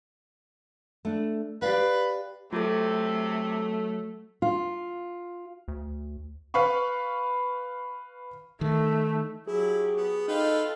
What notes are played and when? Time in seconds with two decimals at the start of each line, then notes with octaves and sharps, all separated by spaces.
1.05 A3 D4
1.62 G4 B4 D5 F5
2.53 C3 F#3 A3 F4 A4
4.42 F4
5.68 D2
6.54 B4 F5 B5 C#6
8.61 D#3 A3
9.47 F#3 E4 G4 G#4
9.97 B3
10.28 D#4 F4 A4 B4 F5 G5